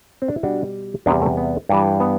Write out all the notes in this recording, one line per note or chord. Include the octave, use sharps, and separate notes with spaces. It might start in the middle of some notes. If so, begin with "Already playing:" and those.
C4
D4
E4
B2 G3 D4 F#4
E2 C3 G3 B3 D4
A3 C4
B3
G2 E3 G3
B3